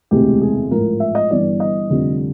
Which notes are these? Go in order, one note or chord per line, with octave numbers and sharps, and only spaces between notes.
E1 D2 C3 E3 G#3 G4
G#4
A1 G#2 F3 A#4
E5
D#5
G1 G2 E3 D5
D#5
F1 F2 D3 G3